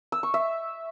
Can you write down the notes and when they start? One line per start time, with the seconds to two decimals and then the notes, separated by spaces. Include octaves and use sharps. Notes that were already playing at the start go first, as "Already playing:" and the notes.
0.12 E6
0.23 C#6
0.34 E5